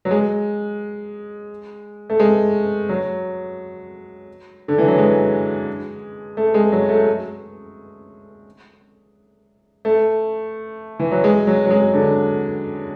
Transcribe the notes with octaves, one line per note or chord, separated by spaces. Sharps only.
F#3
G#3
A3
G#3
F#3
D3
E3
F#3
G#3
A3
G#3
F#3
A3
A3
E3
F#3
G#3
F#3
F#3
G#3
D3